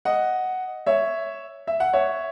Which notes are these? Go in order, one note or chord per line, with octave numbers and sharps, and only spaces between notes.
D#5 F#5
C#5 E5
E5
F#5
C#5 E5